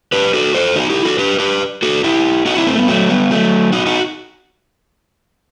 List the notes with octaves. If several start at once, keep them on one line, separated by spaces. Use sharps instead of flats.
G4 B4
F#4 A4
A4 C5
D#4 F#4
E4 G4
F#4 A4
G4 B4
G4 B4
F#4 A4
E4 G4
D#4 F#4
C4 E4
A3 C4
G3 B3
F#3 A3
G3 B3
F#3 A3
D#4 F#4
D#4 F#4